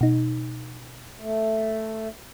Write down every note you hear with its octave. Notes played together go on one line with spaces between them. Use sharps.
B2 D#4
A3